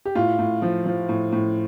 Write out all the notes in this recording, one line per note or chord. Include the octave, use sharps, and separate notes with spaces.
G4
A2 F4
A2
F3
F3
A2
A2